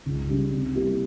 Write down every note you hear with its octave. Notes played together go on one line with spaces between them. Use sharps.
C#2
C#3 G3
C3
G3 A#3 E4 G4